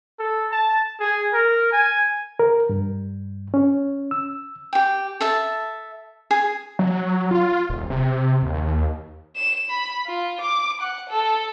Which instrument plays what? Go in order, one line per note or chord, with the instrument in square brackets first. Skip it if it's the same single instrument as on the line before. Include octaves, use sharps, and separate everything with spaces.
[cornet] A4
A5
G#4
A#4
G#5
[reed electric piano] A#4
G2
C#4
E6
[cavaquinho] G4 G5
A4 E5 A5
G#4 G#5
[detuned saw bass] F#3
F4
D#1
C3
D#2
[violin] E7
B5
F4
D6
F#5
A4